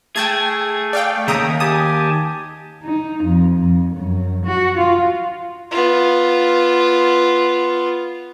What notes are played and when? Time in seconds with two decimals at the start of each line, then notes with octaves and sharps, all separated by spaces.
0.16 A3 G#4 G5 A5 G#6
0.93 D5 F5 G5
1.28 D#2 C#3 E5 G5 A#5 D#6
1.60 G4 G#5 A5 D#6
2.84 D#4
3.24 F2
3.58 F2
3.96 F#2
4.45 F#4
4.78 F4
5.71 B3 F4